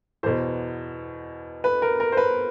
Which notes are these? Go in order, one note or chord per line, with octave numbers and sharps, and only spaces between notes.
E2 B2 C5
B4
A#4
A#4
C5
B4